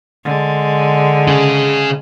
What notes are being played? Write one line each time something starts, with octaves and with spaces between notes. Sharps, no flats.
D3 G#3
C#3 G#4